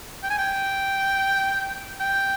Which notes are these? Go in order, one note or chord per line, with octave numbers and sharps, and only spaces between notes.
G5
G#5
G5
G5